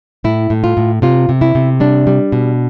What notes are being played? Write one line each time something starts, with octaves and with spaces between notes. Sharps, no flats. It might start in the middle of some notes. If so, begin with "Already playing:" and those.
A2 E4
A2
F4
A2
C3 F4
C3
E4
C3
G3 D4
G3
B2